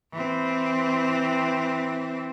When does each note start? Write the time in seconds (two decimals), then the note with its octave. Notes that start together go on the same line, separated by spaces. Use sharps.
0.12 E3 C4